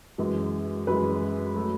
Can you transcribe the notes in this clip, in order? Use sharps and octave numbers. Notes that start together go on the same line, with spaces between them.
F#2 E3 G#3
F#2 E3 G#3 B4
F#3 A3